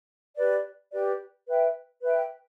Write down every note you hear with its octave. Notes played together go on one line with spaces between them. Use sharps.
G4 B4 D5
G4 B4 D5
B4 E5 G5
B4 E5 G5